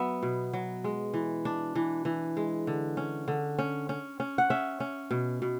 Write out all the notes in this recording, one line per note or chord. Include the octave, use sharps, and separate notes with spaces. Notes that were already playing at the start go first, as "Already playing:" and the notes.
Already playing: F#3 B3 E5
B2
F#3
G#3
E3
D4
E3
E3
G#3
D3
C#4
D3
C#4
C#4
C#4
F#5
C#4 E5
C#4
B2
B2